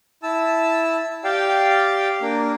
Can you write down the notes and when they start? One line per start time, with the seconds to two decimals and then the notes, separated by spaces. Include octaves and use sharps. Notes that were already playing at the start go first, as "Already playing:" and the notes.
0.23 E4 A5 E6
1.24 G4 D5 F5 G5
2.22 A#3 D4